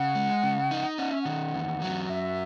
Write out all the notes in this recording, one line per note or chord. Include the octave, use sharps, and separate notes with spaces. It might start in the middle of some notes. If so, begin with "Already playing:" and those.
Already playing: C#3 F#5
G#3
C#3
D#4
C#4 F#5
E5
D#3 F#5
E2
F#3
F#2 E5